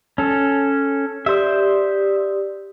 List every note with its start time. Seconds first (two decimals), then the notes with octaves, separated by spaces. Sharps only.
0.18 C#4 A4
1.26 G4 C5 D5 E5 D#6